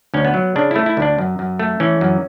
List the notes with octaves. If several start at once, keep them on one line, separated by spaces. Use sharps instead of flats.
D2 C#4
B3
F#3
C#3 D4
A3 E4
E4
D2 D4
F#2
F#2
A3
E3 C#4
F#2